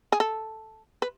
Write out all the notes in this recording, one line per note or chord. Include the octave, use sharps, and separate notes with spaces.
G#4
A4
B4